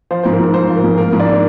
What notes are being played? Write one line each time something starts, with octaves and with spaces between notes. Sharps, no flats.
F3 C5
G#2 C5
A#4
G#2
F3 C5
F3
A#4
G#2
F3 A#4
G#2
D4 D5
A#4